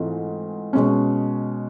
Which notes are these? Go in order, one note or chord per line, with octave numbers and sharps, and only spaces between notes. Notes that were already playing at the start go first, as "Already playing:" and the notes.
Already playing: G#2 E3 A3 C4 F4
B2 G#3 C#4